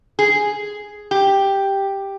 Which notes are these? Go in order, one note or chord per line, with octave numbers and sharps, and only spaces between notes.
G#4
G4